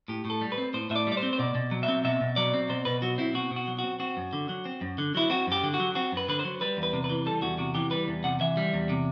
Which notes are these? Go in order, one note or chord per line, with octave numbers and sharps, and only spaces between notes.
A2 G4
A2
A4
G3
B4
C4
A2 C5
A2 E5
D5
G3
D5
C5
C4
C5
B2 D5
B2
F#3
E5
C4
B2 E5
B2
F#3 D5
C4
B2 C5
B2 B4
F#3 F#4
C4 E4
B2 F#4
B2
F#4
F#3
F#4
C4
C4 F#4
F#2
D3
F#3
C4
F#2
D3
F#3 E4
C4 F#4
F#2 G4
D3
F#4
F#3
C4 F#4
F#2 B4
D3 B4
C5
F#3
G3 B4
E2
B4
C3
B4
E3
G3 A4
E2 F#4
C3 F#4
E3 G4
G3 B4
E2
C3 F#5
E3 E5
G3
E2
C3